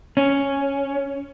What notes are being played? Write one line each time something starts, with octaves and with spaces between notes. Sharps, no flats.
C#4